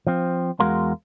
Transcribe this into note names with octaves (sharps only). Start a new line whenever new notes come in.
F3 C4
E2 G#3 F#4 A#4 F5 C6